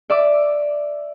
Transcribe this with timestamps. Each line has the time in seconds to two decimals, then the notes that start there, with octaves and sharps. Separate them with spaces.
0.10 D5 E5 D6